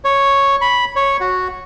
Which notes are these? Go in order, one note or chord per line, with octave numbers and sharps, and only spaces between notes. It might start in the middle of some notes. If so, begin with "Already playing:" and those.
C#5
B5
C#5
F#4